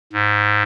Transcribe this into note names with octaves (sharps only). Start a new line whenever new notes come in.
G#2